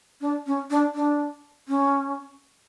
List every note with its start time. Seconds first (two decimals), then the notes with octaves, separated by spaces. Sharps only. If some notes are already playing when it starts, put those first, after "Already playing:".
0.21 D4
0.47 C#4
0.70 D4
0.95 D4
1.68 C#4